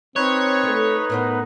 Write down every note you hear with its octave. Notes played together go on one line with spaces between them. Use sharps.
C4 D#4 B4 C#5
A3 A4
A2 B3 A#4 C5